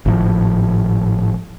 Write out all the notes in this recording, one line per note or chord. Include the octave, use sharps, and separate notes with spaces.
G#1 A2 F3